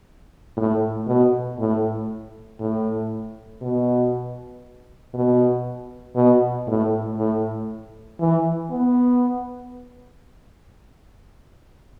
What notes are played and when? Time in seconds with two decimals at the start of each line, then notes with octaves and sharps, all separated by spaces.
0.57 A2
1.08 B2
1.59 A2
2.60 A2
3.62 B2
5.14 B2
6.16 B2
6.68 A2
7.18 A2
8.20 E3
8.70 B3